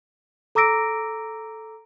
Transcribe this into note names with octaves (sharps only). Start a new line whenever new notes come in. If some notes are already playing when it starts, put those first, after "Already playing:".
A4 A#5 D6 E6 A#6 D7